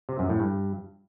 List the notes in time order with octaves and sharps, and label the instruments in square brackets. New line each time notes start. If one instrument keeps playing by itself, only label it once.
[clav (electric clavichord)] C3
F#2
A2
G2